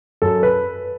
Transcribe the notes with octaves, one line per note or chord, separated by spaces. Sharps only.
F#2 A4
B4